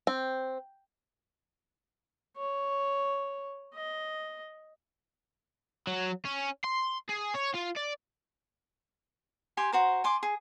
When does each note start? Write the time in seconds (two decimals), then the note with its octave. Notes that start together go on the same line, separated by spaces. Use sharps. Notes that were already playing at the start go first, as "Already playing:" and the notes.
0.07 C4
2.37 C#5
3.74 D#5
5.87 F#3
6.25 C#4
6.64 C6
7.09 G#4
7.35 C#5
7.55 F4
7.77 D5
9.57 G4 G#5 C6
9.72 F#4 C5 A#5
10.04 G#5 C6 D6
10.23 G#4